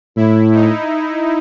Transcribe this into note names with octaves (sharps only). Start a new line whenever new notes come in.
A2 E4
D#4